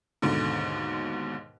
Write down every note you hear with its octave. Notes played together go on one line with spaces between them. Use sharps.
D#2 G#2 B2 D3